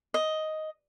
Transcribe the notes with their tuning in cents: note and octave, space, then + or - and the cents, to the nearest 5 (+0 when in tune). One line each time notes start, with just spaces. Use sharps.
D#5 +5